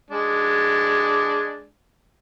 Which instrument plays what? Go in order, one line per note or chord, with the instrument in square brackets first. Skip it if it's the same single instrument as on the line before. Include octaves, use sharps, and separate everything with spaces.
[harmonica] G#3 D4